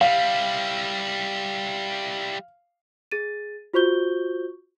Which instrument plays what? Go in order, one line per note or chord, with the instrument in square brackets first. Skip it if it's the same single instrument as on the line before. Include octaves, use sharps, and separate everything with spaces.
[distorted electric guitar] G3 E4 [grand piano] F5
[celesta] G#4 A6 D#7
F4 F#4 C5 C#6 G6 G7